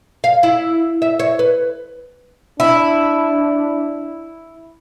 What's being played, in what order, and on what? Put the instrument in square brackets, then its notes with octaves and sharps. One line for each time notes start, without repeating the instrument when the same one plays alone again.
[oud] F5
E4
E5
C#5
B4
[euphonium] D4 [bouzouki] E4